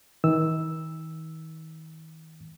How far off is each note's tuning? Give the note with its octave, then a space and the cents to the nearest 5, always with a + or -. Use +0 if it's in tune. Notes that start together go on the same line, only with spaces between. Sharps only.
D#3 +45 E6 +0